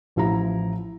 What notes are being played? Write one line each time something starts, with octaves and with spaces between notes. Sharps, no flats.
A1 F3 E4 F5 A#5